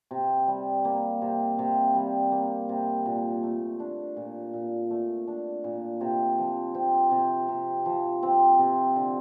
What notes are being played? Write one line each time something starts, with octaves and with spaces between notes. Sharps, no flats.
C3
G3
A#3
C3
C3
G3
A#3
C3
A#2
A3
D4
A#2
A#2
A3
D4
A#2
C3
F3
C4
C3
C3
F3
C4
C3
D3